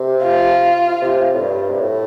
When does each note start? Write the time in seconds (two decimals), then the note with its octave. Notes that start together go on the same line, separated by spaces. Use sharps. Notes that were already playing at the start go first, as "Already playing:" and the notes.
Already playing: C3
0.24 F4
1.02 C3
1.34 A2
1.41 G2
1.70 C3
1.80 A2